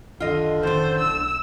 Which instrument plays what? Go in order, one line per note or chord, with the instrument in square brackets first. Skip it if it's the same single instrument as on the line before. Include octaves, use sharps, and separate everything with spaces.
[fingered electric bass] F#1 C2 D#3 [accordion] D3 [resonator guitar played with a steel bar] F4 D#5
[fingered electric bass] F1 D#3 C#4 [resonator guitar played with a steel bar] A2 A3 [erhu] C5
[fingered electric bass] B1 [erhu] E6